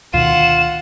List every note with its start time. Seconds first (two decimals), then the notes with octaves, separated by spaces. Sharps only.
0.14 D2 B2 D#3 F4 F#5 E7